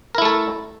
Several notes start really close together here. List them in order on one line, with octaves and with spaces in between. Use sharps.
A#4 E4 A3 A4